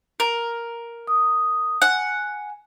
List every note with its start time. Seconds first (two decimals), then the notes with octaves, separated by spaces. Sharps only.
0.20 A#4
1.07 D#6
1.82 F#5 G#5